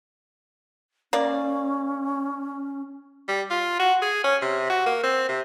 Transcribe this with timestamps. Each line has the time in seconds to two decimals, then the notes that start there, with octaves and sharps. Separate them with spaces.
1.13 A#3 C#4 D5
3.28 G3
3.50 F4
3.79 F#4
4.02 G#4
4.24 C#4
4.41 C3
4.70 F#4
4.86 A#3
5.03 C4
5.29 C3